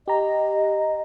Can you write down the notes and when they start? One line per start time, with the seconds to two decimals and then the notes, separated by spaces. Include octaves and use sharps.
0.08 G4 D#5 A#5